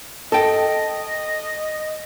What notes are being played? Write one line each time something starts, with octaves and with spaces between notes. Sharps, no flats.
A4 D#5 G5